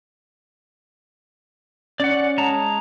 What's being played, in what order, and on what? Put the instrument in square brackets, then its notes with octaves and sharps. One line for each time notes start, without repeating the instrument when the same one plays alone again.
[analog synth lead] C#4 [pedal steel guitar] D5 F#5
[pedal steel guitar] G#3 A5 A#5